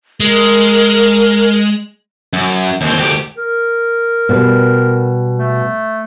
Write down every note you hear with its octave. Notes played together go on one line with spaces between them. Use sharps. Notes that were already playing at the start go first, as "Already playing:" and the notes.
G#3 A#4
F#2
D#2 C4
D2 G4
A#4
B2 G3 B4
A3